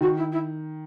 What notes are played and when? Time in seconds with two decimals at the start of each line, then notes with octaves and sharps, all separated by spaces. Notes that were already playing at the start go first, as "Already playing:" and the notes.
0.01 D#3 F#4
0.17 E4
0.32 E4